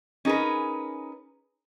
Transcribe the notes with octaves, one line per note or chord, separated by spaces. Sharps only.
C#4 D#4 G#4 A#4 B4